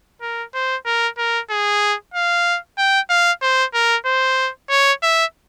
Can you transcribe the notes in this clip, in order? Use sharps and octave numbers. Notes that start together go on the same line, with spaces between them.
A#4
C5
A#4
A#4
G#4
F5
G5
F5
C5
A#4
C5
C#5
E5